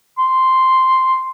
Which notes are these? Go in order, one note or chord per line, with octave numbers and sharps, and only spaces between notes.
C6